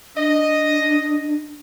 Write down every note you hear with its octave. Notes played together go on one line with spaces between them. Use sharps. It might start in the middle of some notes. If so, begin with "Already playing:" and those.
D4 D#5